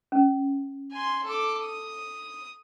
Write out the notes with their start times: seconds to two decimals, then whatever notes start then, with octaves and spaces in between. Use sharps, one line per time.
0.12 C#4
0.92 G#5 C6
1.24 A4 D6
1.64 D#6